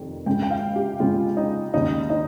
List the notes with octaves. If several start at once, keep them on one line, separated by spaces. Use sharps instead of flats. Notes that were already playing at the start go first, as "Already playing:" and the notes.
Already playing: F1 F2 D#3 G3
C#2 C#3 G#3 G5
G5
F5
G4
C#2 C#3 G#3 F4
D#4
D#2 C#3 G3 D#4
D#4